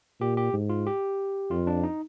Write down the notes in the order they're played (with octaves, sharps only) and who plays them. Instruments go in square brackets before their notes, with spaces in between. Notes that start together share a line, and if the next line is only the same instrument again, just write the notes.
[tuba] A#2 [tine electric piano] G4
[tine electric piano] G4
[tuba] G#2
[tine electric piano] F4
G4
[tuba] F2 [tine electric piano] F4
[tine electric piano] D4
D#4